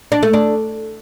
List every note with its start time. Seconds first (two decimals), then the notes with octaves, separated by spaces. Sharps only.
0.12 D4
0.23 A3
0.34 D4